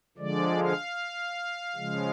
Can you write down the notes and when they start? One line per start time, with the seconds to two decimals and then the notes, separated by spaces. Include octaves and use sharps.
0.18 D3 F3 G#3 D5
0.58 F5
1.76 C#3 F3 G#3